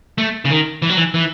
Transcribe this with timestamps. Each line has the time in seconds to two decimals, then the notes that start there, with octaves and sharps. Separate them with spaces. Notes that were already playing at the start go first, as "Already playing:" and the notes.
0.18 A3
0.45 C#3
0.50 D#3
0.82 E3
0.89 F#3
0.97 E3
1.14 E3